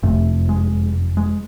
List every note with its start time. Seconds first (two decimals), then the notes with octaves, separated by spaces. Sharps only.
0.03 F#1 F2 C3 A3
0.49 G#3
1.17 G#3